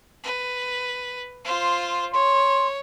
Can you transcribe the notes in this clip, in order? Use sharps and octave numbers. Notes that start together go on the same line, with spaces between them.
B4
F4 C5
C#5 C6